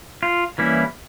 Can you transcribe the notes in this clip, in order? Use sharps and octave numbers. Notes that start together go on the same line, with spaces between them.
F4
E3 G3 A#3 C#4 E4